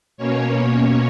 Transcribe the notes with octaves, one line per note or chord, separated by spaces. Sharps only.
B2 A#3 C#4 C#5